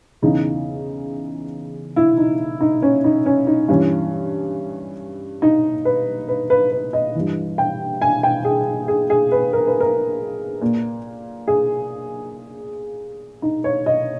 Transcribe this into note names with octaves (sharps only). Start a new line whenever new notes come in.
E2 C#3 E3 D#4
E4
D#4
D#4
C#4
D#4
C#4
D#4
G2 E3 C#4
D#4
B4
B4
B4
B4
D#5
G2 E3
G5
G#5
G5
G#4
G#4
G#4
B4
A#4
B4
A#4
A#2
G#4
D#4
C#5
D#5